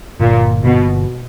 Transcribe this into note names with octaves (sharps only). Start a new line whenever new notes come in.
G1 A#2
G1 B2